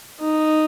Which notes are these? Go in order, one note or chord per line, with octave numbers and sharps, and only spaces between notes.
D#4